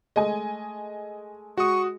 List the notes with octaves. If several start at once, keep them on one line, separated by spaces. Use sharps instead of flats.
G#3 A3 D#5 G#5
G#3 F#4 C#6 D#6